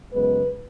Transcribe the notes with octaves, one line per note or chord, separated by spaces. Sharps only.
F#2 C#3 G#3 B3 B4